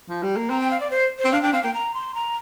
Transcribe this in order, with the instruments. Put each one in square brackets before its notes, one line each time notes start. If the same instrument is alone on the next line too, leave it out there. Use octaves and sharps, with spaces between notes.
[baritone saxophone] F3
G3
A#3
[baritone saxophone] C4 [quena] A#5
[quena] G5
F5
D5
C5
C5
[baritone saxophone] C4
[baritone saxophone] D4 [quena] F5
[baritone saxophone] D4 [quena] G5
[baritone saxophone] C4 [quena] F5
[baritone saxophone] A#3 [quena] G5
[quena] A#5
C6
A#5